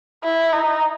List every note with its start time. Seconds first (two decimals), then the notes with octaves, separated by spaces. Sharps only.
0.23 E4
0.52 D#4